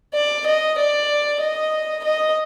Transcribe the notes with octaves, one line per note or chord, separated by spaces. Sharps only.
D5
D#5
D5
D#5
D#5